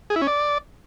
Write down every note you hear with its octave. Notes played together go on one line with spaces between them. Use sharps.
G#4
E4
C#4
D5